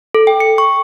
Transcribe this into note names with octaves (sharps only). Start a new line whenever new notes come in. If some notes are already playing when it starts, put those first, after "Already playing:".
A4
G5
C#7
C#6